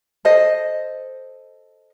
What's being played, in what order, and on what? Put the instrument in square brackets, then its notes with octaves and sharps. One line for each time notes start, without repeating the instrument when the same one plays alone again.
[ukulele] A4 C5 D#5